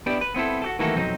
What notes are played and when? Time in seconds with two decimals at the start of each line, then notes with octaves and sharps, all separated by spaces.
0.06 B3 D4 E4 G4 D5
0.21 B4
0.35 B3 C4 E4 A4
0.62 F#4 G4 A4
0.79 D#3 E3 A3 A#3 F#4 A4
0.96 B1 F2 F#3 C4 D#4